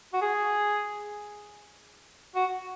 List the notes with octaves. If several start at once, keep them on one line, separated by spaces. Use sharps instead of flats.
F#4
G#4
F#4